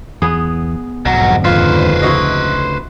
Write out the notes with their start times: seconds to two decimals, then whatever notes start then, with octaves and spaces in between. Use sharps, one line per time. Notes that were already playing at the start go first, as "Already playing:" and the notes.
0.22 E2 E3 B3 G#4
1.05 B1 F2 G#2 B2 D3 F#3
1.45 D#2 F3 F4 B4 C5
2.02 D2 C#3 E4 F#4 D#5